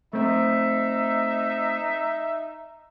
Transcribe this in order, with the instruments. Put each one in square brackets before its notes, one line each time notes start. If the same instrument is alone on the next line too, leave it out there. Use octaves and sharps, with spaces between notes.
[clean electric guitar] A3 C4 [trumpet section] D#4 E5